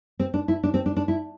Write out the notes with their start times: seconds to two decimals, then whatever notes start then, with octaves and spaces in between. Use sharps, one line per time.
0.19 C4
0.34 D4
0.48 E4
0.63 D4
0.74 C4
0.86 D4
0.97 D4
1.08 E4